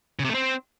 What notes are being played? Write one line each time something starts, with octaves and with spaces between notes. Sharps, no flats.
C#3
C3
A3
C4